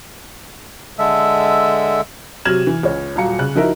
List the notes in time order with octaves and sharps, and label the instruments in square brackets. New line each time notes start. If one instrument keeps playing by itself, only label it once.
[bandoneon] D3 G#3 A4 E5
[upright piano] C3 F#3 F6 G#6 E7 F#7
E3
C#2 C#5
D#1 F#3 F5 A#5 C#7
C#3 F#6
F3 D#4 E4 F#4 A#4 E5